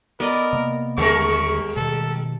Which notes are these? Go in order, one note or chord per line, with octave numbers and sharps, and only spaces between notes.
B3 A#4 D5 D#5
C3 A#3
D#2 D3 G3 G#3 A#4 C#6
B2 D#3 A4